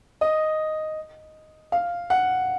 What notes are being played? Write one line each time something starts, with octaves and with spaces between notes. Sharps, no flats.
D#5
F5
F#5